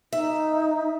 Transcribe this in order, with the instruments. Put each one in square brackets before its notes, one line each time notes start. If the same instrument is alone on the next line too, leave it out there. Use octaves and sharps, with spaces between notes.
[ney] D#4 [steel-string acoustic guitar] E5